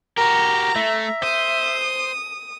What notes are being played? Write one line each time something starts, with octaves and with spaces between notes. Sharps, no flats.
F#4 G4 A#4 A#5
A3 E5
C5 D#6